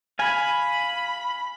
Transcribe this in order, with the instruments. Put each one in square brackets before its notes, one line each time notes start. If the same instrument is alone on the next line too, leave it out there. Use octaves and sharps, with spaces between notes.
[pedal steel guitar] F5 G#5 [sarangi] B5